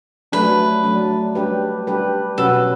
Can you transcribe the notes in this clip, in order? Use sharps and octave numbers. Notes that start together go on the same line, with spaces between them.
F#3 A3 D4 B4
F#3 A3 D4
G3 D4 G4 B4
G3 D4 G4 B4
B2 F#3 C#4 F#4 A4 B4